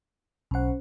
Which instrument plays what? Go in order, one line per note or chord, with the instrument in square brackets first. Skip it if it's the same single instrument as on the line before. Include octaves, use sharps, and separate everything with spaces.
[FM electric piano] B1 F#5 [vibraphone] C#4 C5